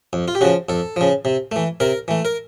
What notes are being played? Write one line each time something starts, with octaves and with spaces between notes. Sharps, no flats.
F2
F4
G4
C#3 F3 F#4
F2 A4
C#3 F3
C3
E3 A3
C3 A#4
E3 A3
A#4